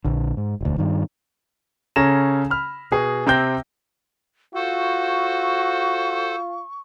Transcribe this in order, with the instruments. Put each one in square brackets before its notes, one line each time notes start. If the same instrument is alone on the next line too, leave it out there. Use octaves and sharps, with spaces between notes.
[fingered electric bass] A#1 D3
G#2
E1 D2
G2 D#3
[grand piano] C#3 C#4 A4 A#5 A#6 E7
B5 F6
B2 G#4
C3 C4 G5 G6 A#6
[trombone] F4 [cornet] F#4 [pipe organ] A4 C5 [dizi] C#6